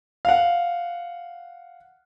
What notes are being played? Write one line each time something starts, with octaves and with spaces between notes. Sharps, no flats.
F5 F#5